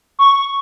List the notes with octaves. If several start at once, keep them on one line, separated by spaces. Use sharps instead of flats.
C#6